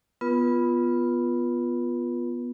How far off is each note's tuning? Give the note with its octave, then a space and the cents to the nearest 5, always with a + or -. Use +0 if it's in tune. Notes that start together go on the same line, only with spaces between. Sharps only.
B3 +0 F4 +0 B4 -35